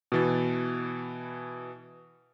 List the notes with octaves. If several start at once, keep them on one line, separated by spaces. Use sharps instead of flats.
B2 E3 A6